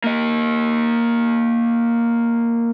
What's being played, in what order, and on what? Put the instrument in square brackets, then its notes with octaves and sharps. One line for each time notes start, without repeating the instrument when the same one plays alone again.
[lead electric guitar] A#3 D#5